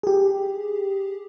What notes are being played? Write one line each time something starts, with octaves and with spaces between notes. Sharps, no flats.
G4 G#4